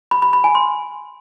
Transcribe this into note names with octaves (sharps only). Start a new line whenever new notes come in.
B5
B5
B5
G#5
C6